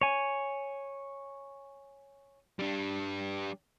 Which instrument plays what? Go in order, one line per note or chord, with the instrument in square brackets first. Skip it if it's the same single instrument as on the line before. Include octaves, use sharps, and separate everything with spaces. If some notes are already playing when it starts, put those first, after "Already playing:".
[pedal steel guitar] C#5 G#5
[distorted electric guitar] G3 D4